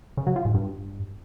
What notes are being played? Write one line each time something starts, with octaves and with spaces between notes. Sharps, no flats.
C#3
F#3
F3
G#2
G2